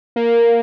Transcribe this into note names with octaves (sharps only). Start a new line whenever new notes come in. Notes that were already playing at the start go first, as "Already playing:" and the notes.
A#3